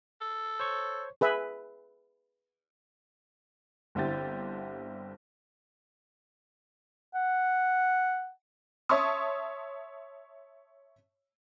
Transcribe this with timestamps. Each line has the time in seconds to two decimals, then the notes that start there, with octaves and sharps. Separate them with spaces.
0.21 A4
0.60 C5 C#5 C#6
1.21 G#4 B4 E5
3.95 G1 D3 C4 E4 G4 A6
7.14 F#5
8.89 C#5 E5 A5 C6 C#6 D#6